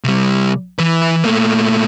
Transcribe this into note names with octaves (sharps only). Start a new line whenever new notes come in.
C2 G3
E3 B4
A#2 A3